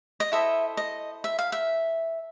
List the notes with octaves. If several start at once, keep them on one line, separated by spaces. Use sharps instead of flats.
D#5
E4 A4 C5 D#5 E5
D#5
E5
F5
E5